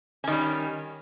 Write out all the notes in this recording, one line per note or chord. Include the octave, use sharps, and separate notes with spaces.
D#3 G3 C#4